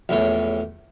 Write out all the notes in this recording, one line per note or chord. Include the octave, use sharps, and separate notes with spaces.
A#1 E2 A2 C#5